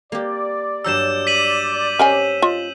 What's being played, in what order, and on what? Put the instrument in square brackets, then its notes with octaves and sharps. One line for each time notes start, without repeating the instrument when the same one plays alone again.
[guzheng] A#3 G4 [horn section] D5
[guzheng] G2 F#3 A#5 [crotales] E6 G6 E7
[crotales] B6 D#7 F#7
[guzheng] C#4 G4 C5 [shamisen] A#4 D#5 G#5
[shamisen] F4 D#5